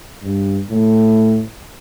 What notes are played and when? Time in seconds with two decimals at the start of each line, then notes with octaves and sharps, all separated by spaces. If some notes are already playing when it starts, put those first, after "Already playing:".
0.22 G2
0.70 A2